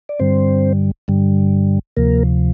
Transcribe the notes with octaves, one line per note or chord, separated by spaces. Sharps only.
D5
G2 D3 G3 C4 C5
G2 D3 G3
D2 C3 F3 A#3 A#4